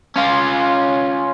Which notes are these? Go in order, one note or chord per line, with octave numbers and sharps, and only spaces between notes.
C#4 F4